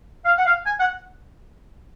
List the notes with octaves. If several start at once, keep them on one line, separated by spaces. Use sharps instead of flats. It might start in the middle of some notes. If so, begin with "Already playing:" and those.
F5
F#5
F5
G#5
F#5